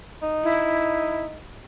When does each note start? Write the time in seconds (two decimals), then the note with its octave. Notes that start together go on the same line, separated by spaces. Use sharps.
0.22 D#4
0.44 E4